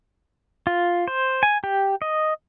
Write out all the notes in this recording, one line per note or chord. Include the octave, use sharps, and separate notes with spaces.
F4
C5
G#5
G4
D#5